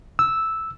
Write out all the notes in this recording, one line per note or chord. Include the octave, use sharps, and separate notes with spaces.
E6